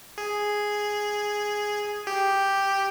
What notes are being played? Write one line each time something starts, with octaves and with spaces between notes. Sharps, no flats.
G#4
G4